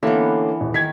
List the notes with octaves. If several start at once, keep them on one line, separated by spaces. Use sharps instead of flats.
D3 E3 A#3 B3 C#4
D#1
D#3 G#6 B6